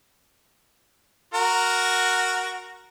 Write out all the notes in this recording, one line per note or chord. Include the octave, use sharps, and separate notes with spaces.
F#4 A#4